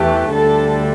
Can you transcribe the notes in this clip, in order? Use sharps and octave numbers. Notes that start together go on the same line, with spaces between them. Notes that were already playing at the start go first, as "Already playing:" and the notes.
Already playing: E2 E3 A3 G4
D2 D3 G3 A4